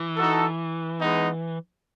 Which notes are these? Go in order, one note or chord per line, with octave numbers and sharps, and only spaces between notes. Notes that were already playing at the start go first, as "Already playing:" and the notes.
Already playing: E3
D#4 F#4 A4
G#3 B3 D#4